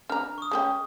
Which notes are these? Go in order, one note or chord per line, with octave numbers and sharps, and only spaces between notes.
D4 A#5 F6
C#6 D#6
G#3 C#4 G5